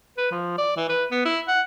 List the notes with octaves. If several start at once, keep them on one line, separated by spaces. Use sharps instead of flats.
B4
F3
D5
E3
B4
B3
E4
F#5